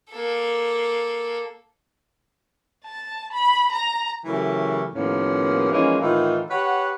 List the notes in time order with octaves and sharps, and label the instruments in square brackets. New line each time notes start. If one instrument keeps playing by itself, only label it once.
[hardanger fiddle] A#3 A4
[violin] A5
B5
A#5
[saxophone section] C#3 E3 F#3 A3 G4 A#4
D#2 A2 F3 A#3 B3 C#4
E3 F3 G#3 A#3 C#4 D#4
A2 D#3 E3 D#4 F4
G4 B4 C#5 F#5